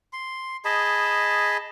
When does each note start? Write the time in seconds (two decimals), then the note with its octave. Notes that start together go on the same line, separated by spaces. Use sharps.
0.13 C6
0.65 G#4 D#5 A5 B5